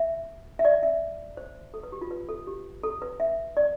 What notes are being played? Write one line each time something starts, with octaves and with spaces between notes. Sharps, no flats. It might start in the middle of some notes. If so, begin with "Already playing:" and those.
Already playing: E5
E5
D5
E5
C5
A4
B4
G4
F4
B4
A4
G4
A4
B4
E5
D5